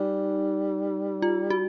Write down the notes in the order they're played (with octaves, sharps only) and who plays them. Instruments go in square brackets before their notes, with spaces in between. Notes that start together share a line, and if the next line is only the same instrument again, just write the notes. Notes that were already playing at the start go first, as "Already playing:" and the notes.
Already playing: [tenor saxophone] G3 [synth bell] D#4
[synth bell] F4
F#4